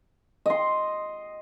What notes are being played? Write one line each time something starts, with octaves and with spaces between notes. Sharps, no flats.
D#5 C6